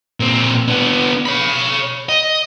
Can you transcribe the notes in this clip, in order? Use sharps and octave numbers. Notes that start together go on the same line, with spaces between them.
A#2 C4
B3 D4
C#5 B5
D#5